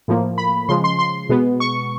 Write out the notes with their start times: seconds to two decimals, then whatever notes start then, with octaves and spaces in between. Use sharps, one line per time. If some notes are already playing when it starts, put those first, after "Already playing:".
0.08 A2 F3 A#3
0.38 B5
0.69 C#3 F3 G#3 C6
0.84 C6
0.99 C6
1.29 B2 G#3 B3
1.60 C#6